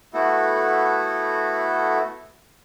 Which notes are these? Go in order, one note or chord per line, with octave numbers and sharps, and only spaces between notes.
A3 B3 E4 F#4 A4